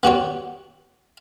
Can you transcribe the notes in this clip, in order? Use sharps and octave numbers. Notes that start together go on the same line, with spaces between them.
B3 F#4 G4 C#5